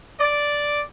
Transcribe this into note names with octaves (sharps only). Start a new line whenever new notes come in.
D5